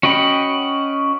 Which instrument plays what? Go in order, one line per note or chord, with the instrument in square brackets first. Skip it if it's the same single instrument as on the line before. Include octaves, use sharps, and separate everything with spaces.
[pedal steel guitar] C#4 F#4 D#5 G5 B5